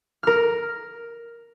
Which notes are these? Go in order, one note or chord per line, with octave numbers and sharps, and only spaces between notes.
A#4 F6